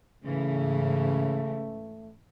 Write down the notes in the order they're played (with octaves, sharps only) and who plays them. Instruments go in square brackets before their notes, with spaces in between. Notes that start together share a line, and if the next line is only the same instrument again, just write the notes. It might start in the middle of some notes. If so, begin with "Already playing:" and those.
[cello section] G#2 E3 C#4 [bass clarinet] C#3 [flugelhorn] A3